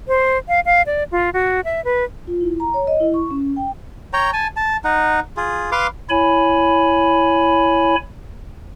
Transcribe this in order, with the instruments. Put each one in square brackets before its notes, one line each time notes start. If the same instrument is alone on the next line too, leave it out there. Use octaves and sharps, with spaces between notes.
[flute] C5
F5
F5
D5
F4
F#4
E5
B4
[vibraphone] F4
E4
A#5
C#5
D#5
E4
C#6
C#4
G5
[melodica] C#5 G5 A#5
G#5 A5
A5
D#4 F#5
F4 G#4
B4 F5 C6 D6
[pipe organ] E4 C#5 G#5 B5